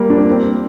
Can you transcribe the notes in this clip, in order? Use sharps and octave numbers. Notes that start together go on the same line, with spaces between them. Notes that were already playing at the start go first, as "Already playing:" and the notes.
Already playing: G3 A#3
D4
C4
A#3
C4